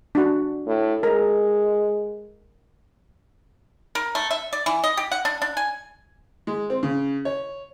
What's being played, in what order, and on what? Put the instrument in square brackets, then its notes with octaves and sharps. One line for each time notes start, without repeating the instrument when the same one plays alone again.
[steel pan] D4 F#4
[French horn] A2
[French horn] G#3 [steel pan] A#4 A#5
[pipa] A#4
A3
E5
D5
E3
D#5
G4
F#5
D4
D4
G#5
[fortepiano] G#3
C4
C#3
C#5